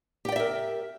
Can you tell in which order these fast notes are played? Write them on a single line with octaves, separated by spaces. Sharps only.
G4 G5 D5 E5 A#4